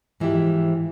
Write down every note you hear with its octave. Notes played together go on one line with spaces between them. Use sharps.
G#2 E3 F3 E4 G4